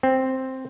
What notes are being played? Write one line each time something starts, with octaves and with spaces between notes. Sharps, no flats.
C4